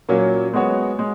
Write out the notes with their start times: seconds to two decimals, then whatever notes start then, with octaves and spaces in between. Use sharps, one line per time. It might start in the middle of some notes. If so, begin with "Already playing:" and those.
0.09 A#2 F#3 A#3 C#4
0.54 G#3 B3 F#4 C#5
0.99 G#3